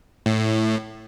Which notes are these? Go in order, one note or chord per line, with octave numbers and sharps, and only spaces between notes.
A2